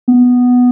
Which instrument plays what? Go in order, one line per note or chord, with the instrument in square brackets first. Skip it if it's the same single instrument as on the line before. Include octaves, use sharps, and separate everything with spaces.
[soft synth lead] B3